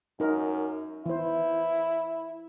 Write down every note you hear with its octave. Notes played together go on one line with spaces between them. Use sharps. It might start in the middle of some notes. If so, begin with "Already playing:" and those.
F#2 D#4 A#4
E3 E4 C5